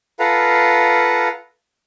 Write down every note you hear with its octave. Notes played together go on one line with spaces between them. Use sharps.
F4 A4 B4 F5 F#5 A#5